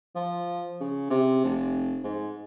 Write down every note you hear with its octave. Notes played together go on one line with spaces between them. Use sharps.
F3
C#3
C3
F1
G#2